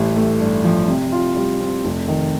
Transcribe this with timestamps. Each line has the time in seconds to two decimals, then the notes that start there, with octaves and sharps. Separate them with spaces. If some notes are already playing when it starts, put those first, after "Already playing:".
Already playing: A1 G3
0.16 A3
0.40 G2
0.65 F3
0.88 C3
1.12 F4
1.36 G3
1.60 C4
1.84 F1
2.08 D#3